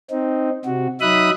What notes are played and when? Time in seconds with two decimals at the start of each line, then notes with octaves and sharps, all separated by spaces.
0.10 C4 D#4
0.65 C3 F#4
1.01 F#3 D#4 E5 B5 D#6 F#6